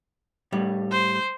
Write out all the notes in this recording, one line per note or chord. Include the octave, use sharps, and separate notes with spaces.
A2 G3
C5